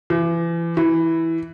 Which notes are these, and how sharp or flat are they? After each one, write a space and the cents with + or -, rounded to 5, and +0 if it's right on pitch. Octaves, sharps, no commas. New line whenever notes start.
E3 +35
E3 -5